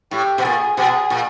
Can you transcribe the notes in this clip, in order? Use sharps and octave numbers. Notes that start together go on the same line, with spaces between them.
A2 G4
B2
A#2 G#4
B2 G#4
A#2